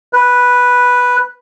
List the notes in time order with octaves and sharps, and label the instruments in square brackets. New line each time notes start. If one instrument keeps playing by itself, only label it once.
[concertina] B4